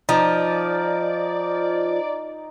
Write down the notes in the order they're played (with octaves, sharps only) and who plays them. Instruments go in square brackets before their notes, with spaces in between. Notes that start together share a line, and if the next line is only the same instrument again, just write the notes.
[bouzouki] F3 [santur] D#4 [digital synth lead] D5